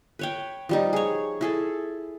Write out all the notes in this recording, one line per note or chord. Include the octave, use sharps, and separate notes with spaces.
B4 C#5 G5
F3 G3 D#4
G#4 C#5
E4 G#4 A4